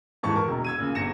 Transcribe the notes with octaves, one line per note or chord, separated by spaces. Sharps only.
D#1 G#2 E3 A5 C#6
A#4
E1
E6 G#6 D#7
A#2 C#3
G1 A#6 C#7 E7